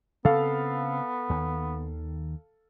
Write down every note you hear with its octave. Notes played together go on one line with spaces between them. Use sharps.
C#3 B3 C4 A4 F5
D#2 D#3